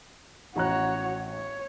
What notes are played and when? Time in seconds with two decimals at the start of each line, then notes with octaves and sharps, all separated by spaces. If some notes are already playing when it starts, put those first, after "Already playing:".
0.56 A1 F#4 C#5 A#5 F#6
1.29 C#5